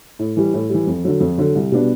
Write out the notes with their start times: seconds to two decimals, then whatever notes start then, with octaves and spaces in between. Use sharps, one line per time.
0.19 A2
0.37 E3 G3
0.54 A2
0.70 E3 G3
0.87 F2
1.04 D3 F#3
1.20 F2
1.38 D3 F#3
1.55 C2
1.72 B2 G3 B3 D4